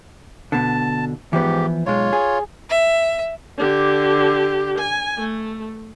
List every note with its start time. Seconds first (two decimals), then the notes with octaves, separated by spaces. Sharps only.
0.52 B2 D3 A5
1.33 G#2 E3 F3 B3 G4
1.86 B1 G#3 F4 C#5
2.13 G#4
2.69 E5
3.58 D3 G4
4.78 G#5
5.18 A3